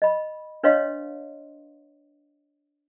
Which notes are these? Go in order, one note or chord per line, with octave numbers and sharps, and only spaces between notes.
D#5 B5
D4 B4 C#5 D#5 F5 C6